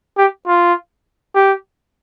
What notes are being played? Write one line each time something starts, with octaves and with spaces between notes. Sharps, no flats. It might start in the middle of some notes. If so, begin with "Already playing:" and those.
G4
F4
G4